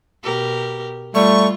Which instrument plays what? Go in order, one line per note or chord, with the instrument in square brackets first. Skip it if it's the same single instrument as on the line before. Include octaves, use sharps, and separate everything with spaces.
[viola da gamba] B2 G4 A#4
[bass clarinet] G3 [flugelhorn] A3 [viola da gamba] F4 [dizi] C#6